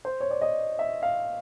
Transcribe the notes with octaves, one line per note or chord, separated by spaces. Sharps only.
C5
C#5
D5
D#5
E5
F5